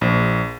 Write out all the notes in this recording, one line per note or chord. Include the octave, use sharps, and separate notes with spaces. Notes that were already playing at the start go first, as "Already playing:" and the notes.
A#1